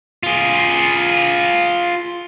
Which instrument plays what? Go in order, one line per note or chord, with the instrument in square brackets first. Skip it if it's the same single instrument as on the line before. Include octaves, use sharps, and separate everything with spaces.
[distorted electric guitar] F4 G#4